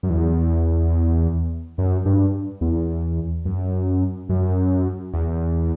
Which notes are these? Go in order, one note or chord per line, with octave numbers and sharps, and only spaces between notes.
F#2
E2
F#2
G2
E2
F#2
F#2
E2